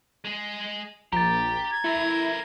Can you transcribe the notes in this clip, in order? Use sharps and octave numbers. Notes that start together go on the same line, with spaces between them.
G#3 G#4
A#1 G4 A#5 A6
G#6
A3 E4 A#4